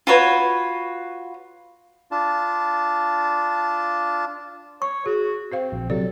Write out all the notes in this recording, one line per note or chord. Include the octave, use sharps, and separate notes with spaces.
F4 F#4 B4 C#5
D4 F4 A5
C#5 C#6
F#4 G#4
C4 F#4 C5 F5
A#1
C3 F#3 A4 D5